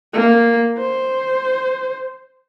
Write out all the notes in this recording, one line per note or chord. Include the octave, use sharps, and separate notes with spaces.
A#3
C5